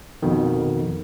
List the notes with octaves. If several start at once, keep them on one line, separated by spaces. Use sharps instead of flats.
F2 B2 D#3